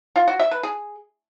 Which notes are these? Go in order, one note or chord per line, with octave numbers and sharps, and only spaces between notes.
F4
F#4
E5
B4
G#4